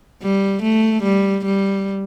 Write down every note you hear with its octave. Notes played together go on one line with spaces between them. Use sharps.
G3
A3
G3
G3